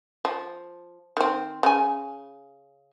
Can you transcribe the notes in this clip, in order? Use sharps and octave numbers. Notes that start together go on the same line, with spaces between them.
F3
D#3 C4
C#3 G#5